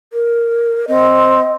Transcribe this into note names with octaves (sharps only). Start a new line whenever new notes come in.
A#4
C4 D#5